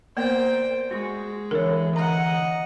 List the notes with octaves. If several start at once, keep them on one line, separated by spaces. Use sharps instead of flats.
A#3 B3 A#4 C5 D5 G5
G#3 F#4
D3 E3 A#4 C#5
D#5 F#5 A#5